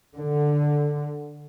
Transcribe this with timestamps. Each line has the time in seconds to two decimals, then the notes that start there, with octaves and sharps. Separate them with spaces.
0.16 D3